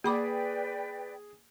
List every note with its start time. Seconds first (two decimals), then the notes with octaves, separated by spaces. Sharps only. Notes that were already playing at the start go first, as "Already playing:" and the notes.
0.04 A#3 G#4 B4 D5 G5 B5 D6